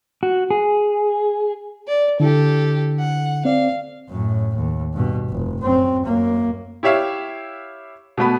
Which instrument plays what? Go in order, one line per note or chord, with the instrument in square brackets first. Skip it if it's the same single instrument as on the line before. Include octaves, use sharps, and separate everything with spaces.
[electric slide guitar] F#4
G#4
[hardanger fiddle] D5
[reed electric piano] D3 E4 [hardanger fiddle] G4 A4
[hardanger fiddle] F#5
[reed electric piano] C4 D5 [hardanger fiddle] F5
[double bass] F#2 A2
D#2
G2 B2
F1
F#2 C4
F#2 A#3
[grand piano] E4 G4 C#5 E5 F5
B2 A3 B3 B5